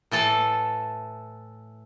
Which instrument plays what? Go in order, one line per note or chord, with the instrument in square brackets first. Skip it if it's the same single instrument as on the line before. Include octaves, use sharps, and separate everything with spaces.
[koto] A2 E3 A4 A5